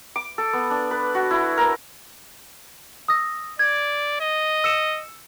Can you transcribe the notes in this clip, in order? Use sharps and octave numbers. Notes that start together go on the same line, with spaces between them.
D6
A4
B3
D4
B4
F#4
E4
A#4
D#6 E6 A#6
D5 G#6
D#5
E6 C#7 E7